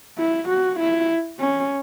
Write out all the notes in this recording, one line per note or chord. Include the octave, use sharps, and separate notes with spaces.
E4
F#4
E4
C#4